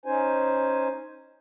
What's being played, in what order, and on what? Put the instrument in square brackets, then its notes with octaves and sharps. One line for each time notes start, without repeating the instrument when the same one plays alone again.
[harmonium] C#4 D#4 C5 G#5